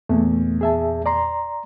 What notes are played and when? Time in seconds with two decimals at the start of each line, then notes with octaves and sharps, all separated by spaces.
0.09 E2 A#2 A3
0.61 G#4 E5 A5
1.06 D5 A#5 C6